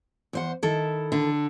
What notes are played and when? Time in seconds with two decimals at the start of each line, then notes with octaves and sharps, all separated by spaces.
0.33 E2 C5 F#5
0.63 D#3 E4 A4
1.12 D3